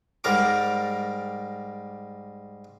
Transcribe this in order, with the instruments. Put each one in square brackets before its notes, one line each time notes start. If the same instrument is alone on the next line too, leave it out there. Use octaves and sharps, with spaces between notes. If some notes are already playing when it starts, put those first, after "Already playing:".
[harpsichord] G#2 G3 A#4 A#5 D6